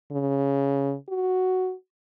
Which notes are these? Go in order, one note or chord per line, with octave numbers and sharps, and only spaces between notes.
C#3
F#4